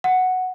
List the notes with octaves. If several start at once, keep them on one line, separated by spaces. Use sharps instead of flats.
F#5